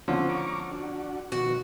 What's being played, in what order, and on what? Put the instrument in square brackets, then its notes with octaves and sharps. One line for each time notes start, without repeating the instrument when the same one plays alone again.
[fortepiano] D3 F3 C#4 [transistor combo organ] C4 E4
[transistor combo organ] A#5 C#6 D6
D4 F#4
[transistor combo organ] B2 D#3 F3 [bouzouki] F#4